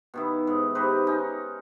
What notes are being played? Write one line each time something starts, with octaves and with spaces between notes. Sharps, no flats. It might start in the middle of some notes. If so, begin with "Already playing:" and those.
B2 D#3 E4
G#2
D#4 G4 B4 C5
C#4 D#4